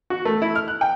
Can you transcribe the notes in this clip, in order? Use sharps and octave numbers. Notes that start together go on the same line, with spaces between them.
F#4
A3
E4
F6
F#6
G5